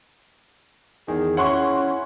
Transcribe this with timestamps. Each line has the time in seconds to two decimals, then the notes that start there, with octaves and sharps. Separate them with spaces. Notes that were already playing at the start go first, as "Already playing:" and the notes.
1.08 E2 D#3 G#4
1.37 C#4 E4 F#5 C6 C#6